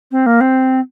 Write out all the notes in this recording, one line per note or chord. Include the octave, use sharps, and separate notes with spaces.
C4
A#3
C4